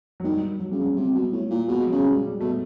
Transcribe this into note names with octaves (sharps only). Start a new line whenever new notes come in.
F#3
D#3 G3
F#3
C#3 G3
F#3
C3 G3
B2
A2
A#2
B2 G#3
F#3
C#3
G3
G3
B2 A3